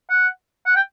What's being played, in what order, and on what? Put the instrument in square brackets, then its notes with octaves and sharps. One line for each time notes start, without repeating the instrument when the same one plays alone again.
[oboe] F#5
F#5
G5